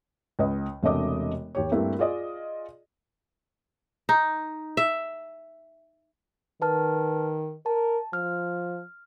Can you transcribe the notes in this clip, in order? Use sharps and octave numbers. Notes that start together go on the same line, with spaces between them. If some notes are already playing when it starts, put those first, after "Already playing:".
C#2 B4 D#5
E1 C3 A3 D4 D#5 D6
D#2 G4 C#5
G2 A3 A#3 C4 E4
F4 G#4 D5 D#5
D#4
E5
D#3 B4 A5 F6
A#4 A5
F3 F6